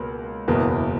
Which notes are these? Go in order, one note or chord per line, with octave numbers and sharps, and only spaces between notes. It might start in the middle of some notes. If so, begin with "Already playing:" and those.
Already playing: C#2 B2 A#3
F#1 E2 B2 A#3